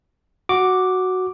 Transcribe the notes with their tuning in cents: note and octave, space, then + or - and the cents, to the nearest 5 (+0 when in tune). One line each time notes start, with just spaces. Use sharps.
F#4 +0 D6 +0